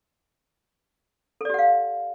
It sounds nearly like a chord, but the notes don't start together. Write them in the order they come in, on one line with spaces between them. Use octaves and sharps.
A4 D5 G4 F#5 F5